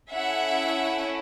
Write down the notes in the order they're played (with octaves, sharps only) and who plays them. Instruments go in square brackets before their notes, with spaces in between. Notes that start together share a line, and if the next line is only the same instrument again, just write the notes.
[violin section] C#4 E4 A4 E5 F#5